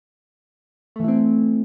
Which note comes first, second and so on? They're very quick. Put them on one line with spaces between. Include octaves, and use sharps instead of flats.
A3 E3 E4 C4